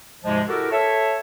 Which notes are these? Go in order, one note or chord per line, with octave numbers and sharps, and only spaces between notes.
D2 G#2 C3 F3 G#3
E4 F#4 G4 A4 A#4
A4 C#5 E5